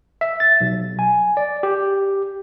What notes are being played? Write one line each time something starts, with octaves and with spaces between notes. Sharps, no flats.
E5
A6
B1
G#5
D5
G4